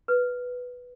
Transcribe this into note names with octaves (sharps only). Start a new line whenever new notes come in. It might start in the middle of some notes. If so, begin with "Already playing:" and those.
B4